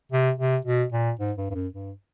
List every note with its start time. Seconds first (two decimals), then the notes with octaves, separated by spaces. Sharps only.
0.12 C3
0.38 C3
0.65 B2
0.92 A#2
1.20 G#2
1.38 G2
1.50 G2
1.55 F#2
1.73 G2